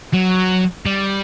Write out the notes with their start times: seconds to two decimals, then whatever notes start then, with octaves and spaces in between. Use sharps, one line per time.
0.14 F#3
0.85 G3